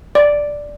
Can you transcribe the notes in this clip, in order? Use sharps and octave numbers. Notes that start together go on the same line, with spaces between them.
D5